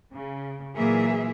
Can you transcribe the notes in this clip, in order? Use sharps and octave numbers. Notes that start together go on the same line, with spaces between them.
C#3
A#2 E3 F#3 A#3 G#4 E5